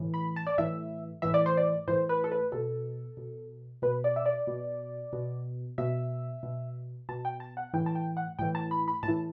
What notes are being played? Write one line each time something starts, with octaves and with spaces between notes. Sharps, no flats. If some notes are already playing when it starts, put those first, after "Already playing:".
Already playing: A2 E3
B5
A5
D5
A2 E3 E5
A2 E3 E5
D5
C5
D5
A2 E3 C5
B4
A4
B4
B2 A4
B2
B2 B4
D5
E5
D5
B2
B2
B2 E5
B2
B2 A5
G5
A5
F#5
A2 E3 G5
A5
G5
F#5
A2 E3 G5
A5
B5
B5
A2 A5
E3